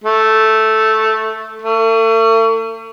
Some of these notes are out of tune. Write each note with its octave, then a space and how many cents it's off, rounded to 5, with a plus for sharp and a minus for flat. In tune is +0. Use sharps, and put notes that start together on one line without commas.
A3 -5
A3 +40